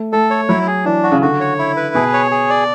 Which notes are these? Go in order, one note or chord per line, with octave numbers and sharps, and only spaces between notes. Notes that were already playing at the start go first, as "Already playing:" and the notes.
Already playing: A3
A3 A4
C#5
F#3 E4
G#4
E3 D4
F#4
C#3
D3 F#4
C#5
E4
B4
B2 G#4
C#5
G#4
D5